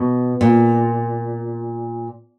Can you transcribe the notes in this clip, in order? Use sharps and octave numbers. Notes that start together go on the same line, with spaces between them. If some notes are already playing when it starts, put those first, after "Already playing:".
Already playing: B2
A#2